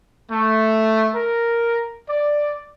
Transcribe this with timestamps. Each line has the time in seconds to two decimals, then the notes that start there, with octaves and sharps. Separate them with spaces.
0.31 A3
1.13 A#4
2.08 D5